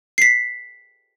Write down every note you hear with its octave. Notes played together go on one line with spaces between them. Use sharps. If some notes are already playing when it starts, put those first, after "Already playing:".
B6 C7